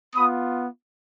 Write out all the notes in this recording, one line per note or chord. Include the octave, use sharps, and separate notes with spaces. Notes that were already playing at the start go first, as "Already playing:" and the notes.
B3 F4 B5 D#6